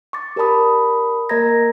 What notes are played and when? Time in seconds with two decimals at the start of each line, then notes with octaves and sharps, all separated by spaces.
0.13 C#6 D6 A6
0.36 G4 A#4 D5 A5 B5 D#6
1.29 A#3 A#4 D#5 A#5 G#6 A#6